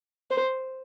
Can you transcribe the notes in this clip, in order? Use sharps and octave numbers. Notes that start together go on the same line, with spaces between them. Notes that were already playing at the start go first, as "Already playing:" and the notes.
C5